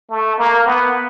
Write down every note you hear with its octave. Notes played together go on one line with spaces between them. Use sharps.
A3
A#3
B3